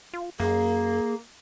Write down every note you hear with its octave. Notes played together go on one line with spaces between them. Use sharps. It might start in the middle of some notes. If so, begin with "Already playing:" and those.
F4
F#2 A#3 G#4